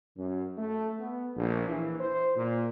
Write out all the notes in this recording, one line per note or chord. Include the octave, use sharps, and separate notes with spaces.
F#2
A3
B3
A#1
E3
C5
A#2